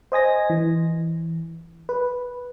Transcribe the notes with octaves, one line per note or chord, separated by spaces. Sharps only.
C5 D#5 G#5 A#6
E3
B4